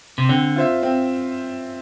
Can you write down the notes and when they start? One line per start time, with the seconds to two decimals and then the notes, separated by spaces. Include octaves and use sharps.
0.18 C3
0.29 D3 C4
0.56 F4 C5 E5
0.83 C4